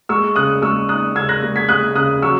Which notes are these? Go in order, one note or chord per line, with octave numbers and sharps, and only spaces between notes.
G#3 C#6 E6
C#3 D#6 F#6
G#3 C#6 E6
D#4 D#6 F#6
C#3 E6 G#6
F#6 A#6
G#3
G#6 B6
G#3 D#6 F#6
C#3 D#6 F#6
F#3 C#6 E6